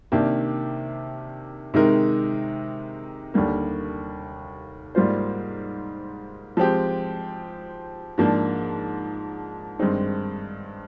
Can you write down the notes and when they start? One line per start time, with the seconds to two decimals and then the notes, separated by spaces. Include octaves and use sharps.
0.12 C3 D#3 A#3 D4 G4
1.74 C3 D#3 G#3 D#4 A#4
3.34 D#2 D3 G3 A#3
4.95 G#2 G3 A#3 F4 C5
6.57 F3 G#3 C4 G4
8.18 G#2 F3 A#3 D4
9.79 G2 D#3 G#3 C4 D#4